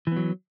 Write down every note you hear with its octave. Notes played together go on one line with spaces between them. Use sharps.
E3 F#3 B3